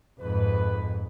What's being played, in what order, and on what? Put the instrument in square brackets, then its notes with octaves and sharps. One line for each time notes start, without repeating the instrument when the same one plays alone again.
[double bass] F2 G#2 [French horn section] B4